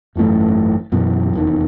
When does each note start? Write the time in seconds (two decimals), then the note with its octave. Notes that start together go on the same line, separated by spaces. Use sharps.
0.16 G#1 F#2 E3 A3
0.92 F#2 B2 E3
1.33 F1 E2 D#3